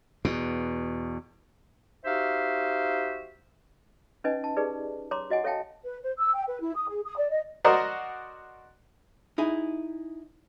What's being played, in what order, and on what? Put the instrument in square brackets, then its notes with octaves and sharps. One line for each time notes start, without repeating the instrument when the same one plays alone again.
[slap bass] E2 B2
[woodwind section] D#4 F#4 G4 C5 E5 F5
[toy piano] C#4 D#4 B4 D#5 G#5
A5
D#4 G4 G#4 B4 D5
C#5 A#5 C6 D6
F#4 D#5 F#5 G#5
A4 C#5 E5 F5 G5 A5
[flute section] B4
C5
E6
G5
B4
E4
D#6
G#4
D#6
D5
D#5
[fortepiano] F#4 A#4 C5 D5 D#5
[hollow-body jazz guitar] D#4 E4 G#4